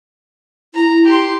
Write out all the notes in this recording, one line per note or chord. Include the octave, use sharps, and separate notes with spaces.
E4 A#5
G4 C6